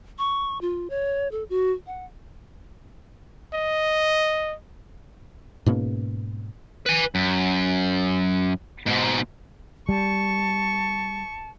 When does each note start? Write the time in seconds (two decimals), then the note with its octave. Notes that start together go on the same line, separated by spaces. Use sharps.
0.18 C#6
0.61 F4
0.90 C#5
1.31 A4
1.50 F#4
1.87 F#5
3.54 D#5
5.66 G#2 B2 A#3 C#4
6.86 B4 G#5
7.15 F#2
8.86 G#2 B2
9.89 G3 A5 C#6